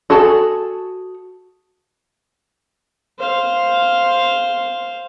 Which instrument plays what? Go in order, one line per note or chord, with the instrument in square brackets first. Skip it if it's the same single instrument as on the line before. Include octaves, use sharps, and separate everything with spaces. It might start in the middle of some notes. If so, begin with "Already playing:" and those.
[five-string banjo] F#4 G#4 A4 A5
[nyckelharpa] C5 F5